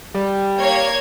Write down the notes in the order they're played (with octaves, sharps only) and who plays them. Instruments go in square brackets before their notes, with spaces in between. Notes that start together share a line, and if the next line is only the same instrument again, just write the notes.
[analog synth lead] G3
[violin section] A#3 C#5 G#6